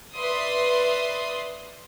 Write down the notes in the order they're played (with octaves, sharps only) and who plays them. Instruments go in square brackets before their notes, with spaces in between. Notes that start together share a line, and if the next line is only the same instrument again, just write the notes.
[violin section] B4 D5 E5 C6 D#6